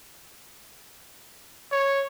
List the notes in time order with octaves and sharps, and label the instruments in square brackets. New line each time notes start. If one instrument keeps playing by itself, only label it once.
[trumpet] C#5